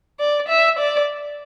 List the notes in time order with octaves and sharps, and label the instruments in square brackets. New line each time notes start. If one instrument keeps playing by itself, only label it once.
[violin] D5
E5
D5